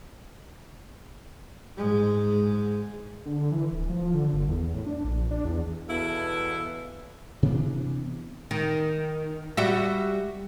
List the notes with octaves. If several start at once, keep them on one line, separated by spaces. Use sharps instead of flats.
G#2 G#3
D3
E3
D1
F3
D3
G1
E2
A2
D4
A#1
D4
E2
E2 B2 E4 A4 B4 F5
C3 E3 B3 D4
D#3
G3 F#4 E5